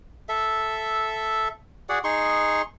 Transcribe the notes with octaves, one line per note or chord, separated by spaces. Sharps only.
A4 E5
F#4 G#4 D5 F#5
D#4 G#4 C6 C#6